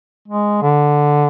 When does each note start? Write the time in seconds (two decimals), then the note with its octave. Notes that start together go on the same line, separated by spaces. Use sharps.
0.28 G#3
0.62 D3